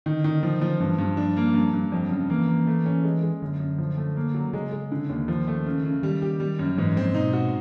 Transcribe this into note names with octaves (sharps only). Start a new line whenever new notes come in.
D3 D#3
D#3
F3
F3
G2 E3
G2 F3
F3 D4
A#3
G2
G2
F2 F3
F#3
C#3
E3 A#3
A#3
A3
C#4
G#3
G#3
F#2 D3
F#2
F3
A3
A#3
F#3
C#3 G#3
G#3
D3
D#2
D#3 F3
A3
C#3
C#3
D#3 G3
G4
G3
F#2
G#2 E3
F3 C4
B2 D#4
F#4